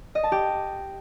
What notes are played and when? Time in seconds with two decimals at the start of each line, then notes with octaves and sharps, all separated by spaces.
0.15 D#5
0.23 A5
0.32 G4